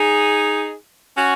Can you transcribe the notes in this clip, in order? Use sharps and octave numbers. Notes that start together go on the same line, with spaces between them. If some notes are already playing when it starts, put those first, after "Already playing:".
Already playing: D#4 G#4
C#4 F#4